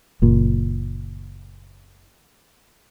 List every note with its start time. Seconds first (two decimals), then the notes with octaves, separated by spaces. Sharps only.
0.22 F#1 A#2